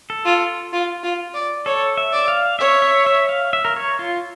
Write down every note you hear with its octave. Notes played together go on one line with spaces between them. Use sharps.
A4
F4
F4
F4
D5
A4 C#5
E5
D5
F5
C#5 E5
E5
E5
F5
E5
A#4
C#5
F4